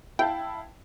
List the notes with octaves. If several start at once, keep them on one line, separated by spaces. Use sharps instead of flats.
E4 F5 G5 A5